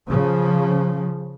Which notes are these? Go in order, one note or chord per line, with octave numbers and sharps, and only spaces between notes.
C#3 F3